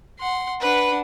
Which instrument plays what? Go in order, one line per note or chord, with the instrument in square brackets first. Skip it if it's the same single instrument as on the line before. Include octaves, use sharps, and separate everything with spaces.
[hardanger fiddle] F#5 C6
[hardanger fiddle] D4 F#5 [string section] B4